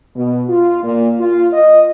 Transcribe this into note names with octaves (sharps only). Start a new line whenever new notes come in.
B2
F4
A#2
F4
D#5